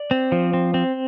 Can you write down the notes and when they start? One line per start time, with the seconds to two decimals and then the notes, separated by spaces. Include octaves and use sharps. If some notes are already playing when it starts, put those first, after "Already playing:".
Already playing: D5
0.11 C4
0.32 F3
0.54 C4
0.74 C4